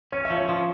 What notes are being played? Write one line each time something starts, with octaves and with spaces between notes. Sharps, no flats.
C#4 C#5
E5
F3
C#5
F3